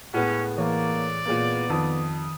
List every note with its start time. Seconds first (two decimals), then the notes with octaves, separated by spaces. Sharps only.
0.14 A2 G#3 B3 C#4 F#5
0.58 E3 A#3 E4 C#5 D5
1.26 A#2 G#3 A#3 B3
1.70 F2 D#3 A5 D#6